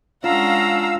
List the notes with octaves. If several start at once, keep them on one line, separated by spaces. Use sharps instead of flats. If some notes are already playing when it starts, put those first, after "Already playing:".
G#3 C#4 D4 F4 F5 F#5 A#5 E6